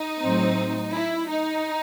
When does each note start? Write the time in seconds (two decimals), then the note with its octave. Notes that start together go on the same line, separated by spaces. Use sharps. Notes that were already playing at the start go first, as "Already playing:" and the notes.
Already playing: D#4
0.21 A2 F#3 C4
0.93 E4
1.28 D#4